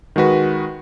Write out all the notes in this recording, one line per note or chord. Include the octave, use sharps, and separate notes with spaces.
D#3 G#3 F#4 B4